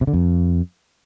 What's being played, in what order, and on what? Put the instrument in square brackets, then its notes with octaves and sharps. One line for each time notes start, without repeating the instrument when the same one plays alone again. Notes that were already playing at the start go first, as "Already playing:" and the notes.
[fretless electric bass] C3
D3
F2